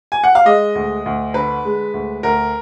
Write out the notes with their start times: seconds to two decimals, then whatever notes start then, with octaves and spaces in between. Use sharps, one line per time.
0.12 G#5
0.24 F#5
0.35 F5
0.45 G#3 D#5
0.75 D2
1.06 D2
1.34 D3 B4
1.65 G#3
1.94 D2
2.23 D2 A#4